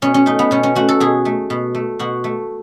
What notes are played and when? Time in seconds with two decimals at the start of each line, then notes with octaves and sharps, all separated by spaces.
0.02 B2 C#4
0.14 C#4
0.26 A3 D#4
0.39 B3
0.51 B2 C#4
0.63 C#4
0.75 A3 F#4
0.89 A4
1.00 B2 G#4
1.25 A3
1.50 B2
1.75 A3
1.99 B2 F#4
2.24 A3